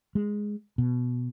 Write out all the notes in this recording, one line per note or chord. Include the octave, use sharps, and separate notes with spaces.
G#3
B2